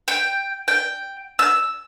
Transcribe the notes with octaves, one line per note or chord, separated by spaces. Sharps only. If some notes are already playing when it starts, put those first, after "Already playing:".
G5
G5
E6